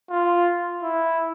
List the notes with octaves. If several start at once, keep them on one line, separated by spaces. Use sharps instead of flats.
F4
E4